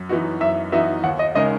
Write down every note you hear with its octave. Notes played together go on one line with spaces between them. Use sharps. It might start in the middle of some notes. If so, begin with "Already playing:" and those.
Already playing: F#2
E3 B3 D#4 F#4
F#2 E5
E3 B3 D#4 F#4 E5
D#2 F#5
D#5
C#3 G#3 D#4 A#4 D#5